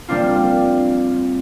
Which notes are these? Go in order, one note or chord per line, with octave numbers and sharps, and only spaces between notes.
G3 A#3 C4 D4 F4